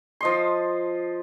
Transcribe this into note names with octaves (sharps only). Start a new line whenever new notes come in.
F3 D#5 C6